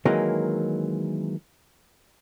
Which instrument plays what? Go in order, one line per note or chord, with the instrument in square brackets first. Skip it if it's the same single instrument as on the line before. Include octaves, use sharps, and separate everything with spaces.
[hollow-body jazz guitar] D#3 E3 F#3 G#3 A#3